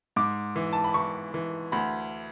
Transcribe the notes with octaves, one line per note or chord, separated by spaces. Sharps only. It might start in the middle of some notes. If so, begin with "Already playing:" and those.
G#2 D6
E3
A5
B5
E3 C#6
E3
D2 B5